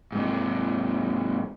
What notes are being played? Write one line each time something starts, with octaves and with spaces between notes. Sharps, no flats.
G#2 C3